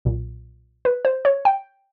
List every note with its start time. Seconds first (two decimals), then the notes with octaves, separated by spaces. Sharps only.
0.05 B1 A#2
0.85 B4
1.05 C5
1.25 C#5
1.45 G5